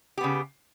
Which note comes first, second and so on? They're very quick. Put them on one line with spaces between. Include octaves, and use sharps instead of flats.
G4 B3 C#3